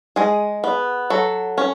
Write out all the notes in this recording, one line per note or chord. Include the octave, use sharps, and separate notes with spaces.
G#3 G#4
B3
F#3 A4
C#4